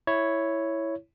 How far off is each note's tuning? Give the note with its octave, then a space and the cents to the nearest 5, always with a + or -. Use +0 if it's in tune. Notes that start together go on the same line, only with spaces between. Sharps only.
E4 +0 C#5 +0